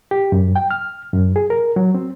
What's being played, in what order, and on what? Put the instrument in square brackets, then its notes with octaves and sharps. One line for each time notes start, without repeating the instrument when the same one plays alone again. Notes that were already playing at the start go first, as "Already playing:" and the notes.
[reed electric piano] G4
F#2
G5
F6
F#2
G#4
A#4
F#3
C4